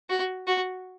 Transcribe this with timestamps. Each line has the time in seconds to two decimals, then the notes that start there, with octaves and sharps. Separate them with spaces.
0.10 F#4
0.47 F#4